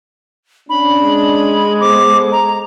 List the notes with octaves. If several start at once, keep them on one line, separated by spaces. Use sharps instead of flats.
C#4 D4 B5
G#3
B3 A4 C5 D6
A#5